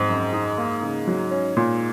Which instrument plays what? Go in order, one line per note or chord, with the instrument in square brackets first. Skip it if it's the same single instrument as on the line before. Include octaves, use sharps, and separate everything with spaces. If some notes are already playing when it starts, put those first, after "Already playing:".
Already playing: [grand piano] G#2 [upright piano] C4
[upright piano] F#2
D#4
A#3
C#3
F#3
C#4
A#2